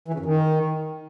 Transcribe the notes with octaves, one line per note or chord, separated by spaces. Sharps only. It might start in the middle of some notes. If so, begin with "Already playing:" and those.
E3
C#3
F#2
D#3